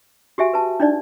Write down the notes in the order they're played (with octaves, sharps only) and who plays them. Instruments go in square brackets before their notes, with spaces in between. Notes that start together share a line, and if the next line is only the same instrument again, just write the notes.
[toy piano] F#4 G4 E5 G#5
B4 A5
D4 D#4 D5